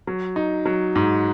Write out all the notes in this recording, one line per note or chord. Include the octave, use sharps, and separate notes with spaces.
F#3
D#4
F#3
G#2